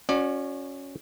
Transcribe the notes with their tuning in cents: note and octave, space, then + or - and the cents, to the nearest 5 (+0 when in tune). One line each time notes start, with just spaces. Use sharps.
C#4 +0 F#4 -15 D5 +30